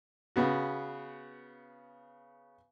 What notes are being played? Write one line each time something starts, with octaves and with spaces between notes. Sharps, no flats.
C#3 B3 F#4